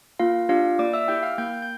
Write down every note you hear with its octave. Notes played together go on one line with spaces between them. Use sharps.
A#3 F4 F5
D4 F4 G4 F5
A#3 D5 D6
E5 E6
E4 G4 G5 G6
F5 F6
A#3 G5 G6
G6